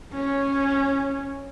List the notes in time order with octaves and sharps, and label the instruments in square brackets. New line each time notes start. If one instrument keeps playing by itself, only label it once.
[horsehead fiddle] C#4